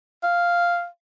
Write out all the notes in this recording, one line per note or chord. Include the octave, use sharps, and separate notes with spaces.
F5